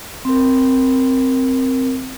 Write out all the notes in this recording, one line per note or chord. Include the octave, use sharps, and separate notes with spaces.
C4 A#4